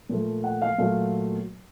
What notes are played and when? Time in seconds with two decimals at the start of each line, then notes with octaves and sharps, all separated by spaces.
0.09 A#2 F3 A3
0.44 F#5
0.62 F5
0.78 A#2 F#3 A3 F5